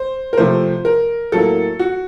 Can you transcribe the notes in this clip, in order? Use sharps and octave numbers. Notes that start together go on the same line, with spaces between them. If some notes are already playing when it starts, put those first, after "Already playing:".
Already playing: C5
A#4
C3 F3 A3 C5
A#4
A2 F#3 A#3 A4
F#4